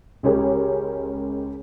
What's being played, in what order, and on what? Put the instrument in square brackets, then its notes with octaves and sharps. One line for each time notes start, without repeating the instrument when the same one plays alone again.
[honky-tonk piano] C#2 G#3 C#4 G4 A#4